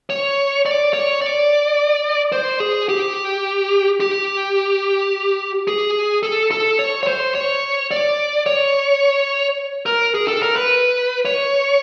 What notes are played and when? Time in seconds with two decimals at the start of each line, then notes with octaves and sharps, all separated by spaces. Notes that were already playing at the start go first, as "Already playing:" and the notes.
0.10 C#5
0.66 D5
0.93 C#5
1.21 D5
2.32 C5
2.60 G#4
2.89 G4
4.00 G4
5.68 G#4
6.23 A4
6.51 A4
6.79 C#5
7.03 C#5
7.07 C5
7.35 C#5
7.91 D5
8.46 C#5
9.86 A#4
10.15 G#4
10.28 A4
10.43 A#4
10.56 B4
11.25 C#5